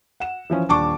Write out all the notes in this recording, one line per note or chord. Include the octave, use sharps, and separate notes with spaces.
F#5 E7
E3 F3 C#4
D#1 D4 A5 C#6 D6